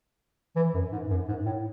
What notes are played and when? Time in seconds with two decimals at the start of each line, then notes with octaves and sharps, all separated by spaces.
0.56 E3
0.74 F#2
0.92 G#2
1.10 F#2
1.28 G#2
1.45 A2